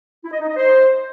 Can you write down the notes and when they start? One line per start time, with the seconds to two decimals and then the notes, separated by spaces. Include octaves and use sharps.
0.24 E4
0.32 D#5
0.40 D#4
0.48 D#5
0.57 C5